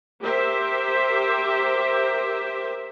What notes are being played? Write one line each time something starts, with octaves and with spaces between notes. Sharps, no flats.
G4 A#4 C5 E5